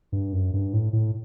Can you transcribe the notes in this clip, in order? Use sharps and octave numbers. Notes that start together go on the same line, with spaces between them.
G2
F#2
G2
A2
A2